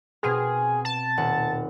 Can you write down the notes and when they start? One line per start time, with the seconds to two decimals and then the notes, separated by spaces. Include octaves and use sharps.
0.23 B2 C4 G#4 F6
0.85 A5
1.17 D#1 F#5